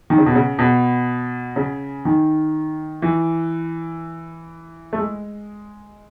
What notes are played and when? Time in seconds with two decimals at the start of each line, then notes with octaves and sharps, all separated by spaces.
0.10 D#3
0.18 C#3
0.26 B2
0.35 C#3
0.59 B2
1.56 C#3
2.05 D#3
3.02 E3
4.93 A3
4.98 G#3